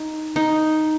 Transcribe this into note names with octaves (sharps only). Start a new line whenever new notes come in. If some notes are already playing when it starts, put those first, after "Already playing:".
Already playing: D#4
D#4